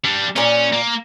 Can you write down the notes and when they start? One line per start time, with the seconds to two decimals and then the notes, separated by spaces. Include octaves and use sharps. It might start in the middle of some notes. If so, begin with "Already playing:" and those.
0.05 G3 D4
0.36 A#2 C#4 D5
0.72 A#3